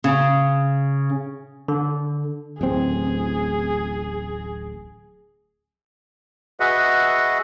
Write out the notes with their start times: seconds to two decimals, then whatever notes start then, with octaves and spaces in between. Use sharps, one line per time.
0.04 C#3
1.68 D3
2.61 D1 A1 C4 G#4
6.60 F#4 G#4 B4 D#5 E5 F#5